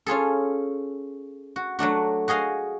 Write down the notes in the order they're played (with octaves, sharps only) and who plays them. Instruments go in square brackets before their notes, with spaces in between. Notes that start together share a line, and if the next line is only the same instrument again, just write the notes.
[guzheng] C#4 F4 G#4 A4
F#4
F#3 A3 D4 F#4
F#4 G#4 D#5 F5